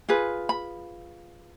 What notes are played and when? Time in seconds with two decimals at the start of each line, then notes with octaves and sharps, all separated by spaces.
0.09 F4 G#4 B4
0.49 B5